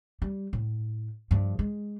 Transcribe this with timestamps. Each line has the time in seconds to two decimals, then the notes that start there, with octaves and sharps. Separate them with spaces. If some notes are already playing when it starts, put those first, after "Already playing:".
0.22 G3
0.53 A2
1.31 G2 F3
1.59 G#3